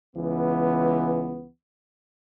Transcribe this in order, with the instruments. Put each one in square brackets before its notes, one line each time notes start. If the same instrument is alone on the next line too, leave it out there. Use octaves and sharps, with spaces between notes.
[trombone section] C#2 E3 B3